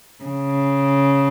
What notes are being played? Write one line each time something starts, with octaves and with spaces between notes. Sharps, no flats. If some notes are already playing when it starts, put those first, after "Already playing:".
C#3